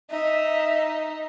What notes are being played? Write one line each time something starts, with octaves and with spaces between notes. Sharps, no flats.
D#4 E5